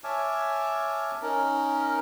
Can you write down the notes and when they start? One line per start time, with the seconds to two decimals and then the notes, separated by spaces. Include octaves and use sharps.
0.04 C#5 E5 G#5 A5 D6 F6
1.22 C#4 D#4 A#4